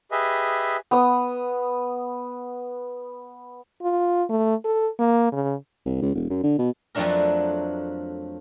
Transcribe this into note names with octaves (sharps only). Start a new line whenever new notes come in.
G4 G#4 B4 D#5 E5
B3 D#6
F4
A3
A4
A#3
C#3
C2
C#2
E1
F#2
D3
B2
F2 F3 F#3 A3 D4 A#4